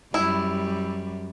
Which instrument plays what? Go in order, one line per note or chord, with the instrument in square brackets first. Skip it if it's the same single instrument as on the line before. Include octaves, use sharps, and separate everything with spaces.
[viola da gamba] F#2 G3 [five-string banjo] E4